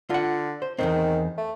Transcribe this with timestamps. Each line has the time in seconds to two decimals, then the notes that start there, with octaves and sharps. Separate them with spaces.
0.10 D3 F4 F#5
0.62 C5
0.79 E2 G#2 D#3 C4
1.38 A3